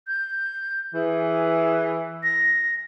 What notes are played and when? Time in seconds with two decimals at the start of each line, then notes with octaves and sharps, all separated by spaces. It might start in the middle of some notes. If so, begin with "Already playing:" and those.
0.08 G6
0.94 E3 G#4
2.23 A#6